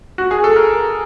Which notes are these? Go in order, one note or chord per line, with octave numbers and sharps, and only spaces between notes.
F#4
G#4
A4
A#4